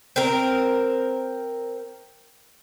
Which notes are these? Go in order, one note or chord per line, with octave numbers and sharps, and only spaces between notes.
C4 A#4